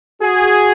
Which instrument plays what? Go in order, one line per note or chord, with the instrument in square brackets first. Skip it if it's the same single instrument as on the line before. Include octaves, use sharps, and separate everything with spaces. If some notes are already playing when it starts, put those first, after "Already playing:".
[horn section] F#4 G#4